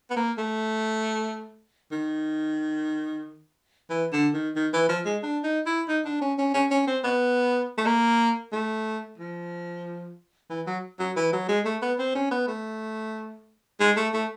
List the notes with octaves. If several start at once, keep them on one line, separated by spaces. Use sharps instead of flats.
B3
A#3
A3
D#3
E3
D3
D#3
D#3
E3
F3
G#3
D4
D#4
E4
D#4
D4
C#4
C#4
C#4
C#4
C4
B3
A3
A#3
A3
F3
E3
F#3
F#3
E3
F#3
G#3
A3
B3
C4
C#4
B3
A3
G#3
A3
A3